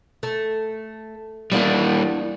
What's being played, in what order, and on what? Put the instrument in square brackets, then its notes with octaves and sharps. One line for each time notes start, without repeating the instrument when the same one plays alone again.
[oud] A3
[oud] E2 D4 E4 [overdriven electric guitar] G3 A#3